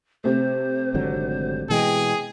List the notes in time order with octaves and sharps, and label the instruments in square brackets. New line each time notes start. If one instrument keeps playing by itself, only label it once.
[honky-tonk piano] C3 A3 [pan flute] C5
[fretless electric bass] G#1 D3 F#3
[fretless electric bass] B2 E3 G#3 [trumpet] G#4 [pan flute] G5